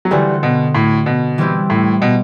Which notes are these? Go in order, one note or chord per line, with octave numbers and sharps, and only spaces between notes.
F#3
D3 E3 G3 A3 C4 F#4
B2
A2
B2
E3 G3 C4 E4 G4
A2
B2